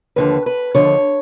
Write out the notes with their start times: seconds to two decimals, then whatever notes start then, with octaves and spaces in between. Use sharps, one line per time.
0.16 D#2 D3 F3 B4
0.46 B4
0.74 D#2 D3 F3 C#5